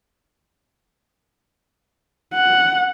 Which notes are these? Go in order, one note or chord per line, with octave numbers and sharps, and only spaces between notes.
F#5